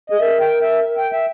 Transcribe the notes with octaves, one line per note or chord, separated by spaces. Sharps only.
G#4 D#5
A#4 E5
G5
E5
G5
E5